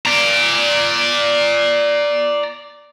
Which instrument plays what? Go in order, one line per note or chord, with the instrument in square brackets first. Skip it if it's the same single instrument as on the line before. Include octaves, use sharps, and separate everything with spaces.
[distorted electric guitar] D5 A#5